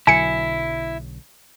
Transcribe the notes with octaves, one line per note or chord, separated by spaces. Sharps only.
B1 D3 F#3 E4 G#5 C#7